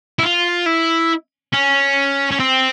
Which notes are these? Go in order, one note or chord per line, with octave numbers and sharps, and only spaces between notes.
E4
F4
E4
C#4
C#4
C4